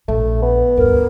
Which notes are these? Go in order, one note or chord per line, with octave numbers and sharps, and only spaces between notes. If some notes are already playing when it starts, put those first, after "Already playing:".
A#1 A3
B3
D2 G2 A#4